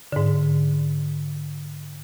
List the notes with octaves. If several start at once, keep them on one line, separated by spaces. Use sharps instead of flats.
G#2 D3